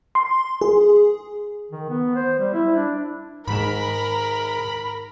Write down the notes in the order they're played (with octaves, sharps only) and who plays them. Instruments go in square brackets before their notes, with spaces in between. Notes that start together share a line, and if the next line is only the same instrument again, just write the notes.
[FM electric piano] C6
G#4
[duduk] D#3
B3
C5
G3
E4
D4
[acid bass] G#2 [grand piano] D#3 G#3 E7 [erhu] A#4 [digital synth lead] B5